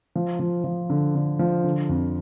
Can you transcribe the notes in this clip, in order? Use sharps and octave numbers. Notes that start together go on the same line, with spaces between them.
F3
F3
F3
D3
D3
F3
D3
F2